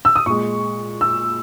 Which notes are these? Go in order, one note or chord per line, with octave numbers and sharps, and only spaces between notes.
E6
D#6
A#2 G#3 C#6
E6